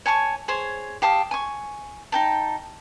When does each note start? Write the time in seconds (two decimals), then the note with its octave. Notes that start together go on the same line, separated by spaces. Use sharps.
0.06 C#5 G#5 A5 C#6
0.48 G#4 C5 C#5
1.02 G4 F5 A5 D#6
1.31 G#5 C#6
2.12 D#4 G5 A5